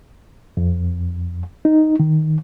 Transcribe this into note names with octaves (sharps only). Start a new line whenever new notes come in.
F2
D#4
D#3